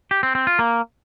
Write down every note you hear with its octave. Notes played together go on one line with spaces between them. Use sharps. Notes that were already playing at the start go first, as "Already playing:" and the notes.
G4
C4
C4
F4
A#3